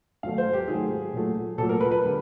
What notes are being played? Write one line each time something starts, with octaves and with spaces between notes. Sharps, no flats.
G#2 D#3 F#3 A3 F5
C5
G4
G#2 D#3 F#3 A3 G#4
A#2 F#3 A3
A#2 F#3 A3 A4
A#4
B4
B4
D3 G3